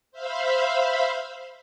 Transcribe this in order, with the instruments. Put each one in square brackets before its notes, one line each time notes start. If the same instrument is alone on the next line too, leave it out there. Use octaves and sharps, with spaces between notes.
[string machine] C5 E5 F5 B5